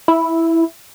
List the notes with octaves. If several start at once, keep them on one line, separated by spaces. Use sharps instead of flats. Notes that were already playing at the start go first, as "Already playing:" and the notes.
E4